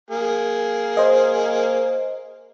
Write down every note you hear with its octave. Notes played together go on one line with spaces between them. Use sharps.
A#3 G#4
C5 D#5